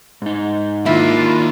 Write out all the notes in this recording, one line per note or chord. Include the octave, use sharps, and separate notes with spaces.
G#2 D#4
D#3 A#3 D4 E4 F4